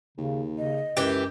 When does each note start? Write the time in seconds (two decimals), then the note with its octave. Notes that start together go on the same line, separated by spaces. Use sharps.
0.18 D#2 C#3
0.58 C#3 D#5
0.97 C#2 F#2 E3 G4